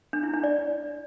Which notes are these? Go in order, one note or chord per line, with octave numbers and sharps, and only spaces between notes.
D4
E4
D4
D5